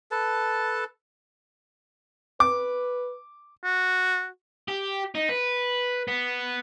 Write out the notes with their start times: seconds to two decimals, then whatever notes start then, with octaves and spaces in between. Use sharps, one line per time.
0.11 A4 B4 A5
2.40 B4 D6
3.64 F#4
4.68 G4
5.15 D#4
5.29 B4
6.08 B3